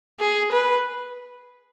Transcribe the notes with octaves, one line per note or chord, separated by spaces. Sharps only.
G#4
B4